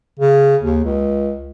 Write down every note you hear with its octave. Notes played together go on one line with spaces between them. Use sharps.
C#3
D#2
C#2